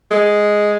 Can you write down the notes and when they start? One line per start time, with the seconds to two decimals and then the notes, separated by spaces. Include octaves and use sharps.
0.11 G#3